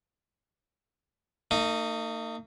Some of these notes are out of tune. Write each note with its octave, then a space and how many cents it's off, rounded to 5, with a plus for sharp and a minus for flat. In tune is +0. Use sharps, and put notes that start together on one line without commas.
A#3 -45 D#4 +0